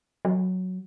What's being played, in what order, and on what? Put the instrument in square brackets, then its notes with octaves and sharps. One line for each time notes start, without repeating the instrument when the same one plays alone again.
[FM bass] F#3